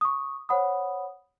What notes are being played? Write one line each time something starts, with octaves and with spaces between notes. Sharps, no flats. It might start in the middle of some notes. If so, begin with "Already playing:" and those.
C#6 D#6
C5 C#5 F#5 B5 D#6